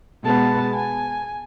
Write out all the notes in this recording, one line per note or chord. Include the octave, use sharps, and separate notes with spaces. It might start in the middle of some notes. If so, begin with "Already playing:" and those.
B2 G#3 B3 A5
G#5